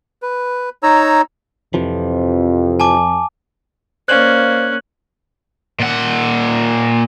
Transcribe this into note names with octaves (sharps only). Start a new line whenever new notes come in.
B4
D#4 C#5 A#5 E6
F2 C3 E3 F3
G#5 A5 D6
A#3 C#4 C5 D5 F5 F#6 G#6 F#7
A#2 F#5